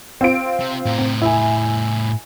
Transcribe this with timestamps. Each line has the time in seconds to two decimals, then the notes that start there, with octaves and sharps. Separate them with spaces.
0.21 C4 F4 D7
0.60 C3
0.86 A2 A#4
0.98 C4
1.22 E4 G#5